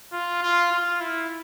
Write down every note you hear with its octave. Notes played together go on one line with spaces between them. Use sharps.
F4
F4
F4
E4